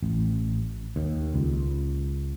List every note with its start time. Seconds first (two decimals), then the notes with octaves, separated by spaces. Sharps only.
0.02 A1
0.96 D#2
1.34 C#2